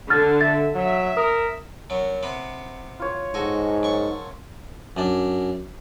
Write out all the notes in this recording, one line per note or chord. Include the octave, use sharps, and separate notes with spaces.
D3 F6 A6
E5 A6
F#3 E5
A#4 D#6
F#2 F#3
C3 B3 B5
F4 C#5
G#2 F#4 A4 D#5
F#2 C#6
F#2 D4